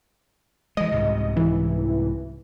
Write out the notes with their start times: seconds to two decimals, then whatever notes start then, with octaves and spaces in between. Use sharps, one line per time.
0.77 E3 G#3 D#5
0.92 C2 G#2 C3
1.37 E3